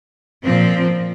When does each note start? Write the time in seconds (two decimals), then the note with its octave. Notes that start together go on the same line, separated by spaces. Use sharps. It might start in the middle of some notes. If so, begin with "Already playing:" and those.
0.44 A#2 F3 C4